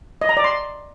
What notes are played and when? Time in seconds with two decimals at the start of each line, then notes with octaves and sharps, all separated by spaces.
0.22 D#5
0.29 A#5
0.37 D5
0.44 C6